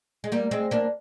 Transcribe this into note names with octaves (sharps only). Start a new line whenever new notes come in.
G#3
G3 A#3
G#3 C4
A#3 D4